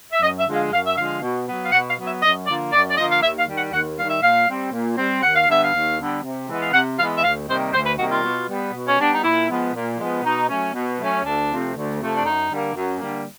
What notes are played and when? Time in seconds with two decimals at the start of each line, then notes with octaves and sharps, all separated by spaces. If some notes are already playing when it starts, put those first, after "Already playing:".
0.13 E5
0.22 F#2 D#5
0.39 E5
0.47 D3 F3 G#3
0.56 F5
0.72 F#2 F5
0.87 E5
0.97 D3 F3 G#3 F5
1.22 B2
1.47 F#3 B3
1.66 F5
1.72 B2 F#5
1.89 F5
1.97 F#3 B3
2.06 E5
2.22 F#2 D#5
2.47 D3 F3 A#3 D5
2.72 F#2 D5
2.89 D5
2.97 D3 F3 A#3 D#5
3.12 F5
3.22 D#2 E5
3.39 F5
3.48 D#3 G3
3.56 F#5
3.72 D#2 F#5
3.98 D#3 G3 F5
4.10 E5
4.22 A#2 F5
4.48 G3 C4
4.72 A#2
4.97 G3 C4
5.23 D#2 F#5
5.36 F5
5.48 D3 G3 B3 E5
5.64 F5
5.73 D#2
5.98 D3 G3 B3
6.23 C3
6.48 E3 G#3 B3
6.62 F5
6.73 C3 F#5
6.98 E3 F5
7.01 G#3 B3
7.17 E5
7.23 D2 F5
7.48 C3 D#3 G3 A#3 C5
7.73 D2 C5
7.86 B4
7.98 C3 D#3 G3 A#3 F#4
8.11 F4
8.23 B2
8.48 G3 B3
8.74 B2
8.87 C#4
8.99 G3 B3 D4
9.12 D#4
9.23 A#2 E4
9.49 F3 G#3 B3
9.73 A#2
9.98 F3 G#3 B3
10.23 B2 D#4
10.49 F#3 A3 C#4
10.74 B2
10.99 F#3 A3 C#4
11.24 D2 D4
11.48 C3 F3 A3 C4
11.74 D2
11.99 C3 F3 A3 C4
12.17 D4
12.23 F#2 D#4
12.49 D3 G3 A#3
12.74 F#2
12.99 D3 G3 A#3